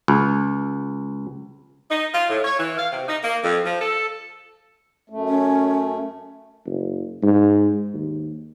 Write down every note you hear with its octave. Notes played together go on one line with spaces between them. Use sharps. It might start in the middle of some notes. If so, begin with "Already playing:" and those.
C#2
D#4
F4
A2
C#5
E3
F5
C3
D#4
A#3
F2
F3
A4
F#2 A3
C#4
F#1
G#2
D#2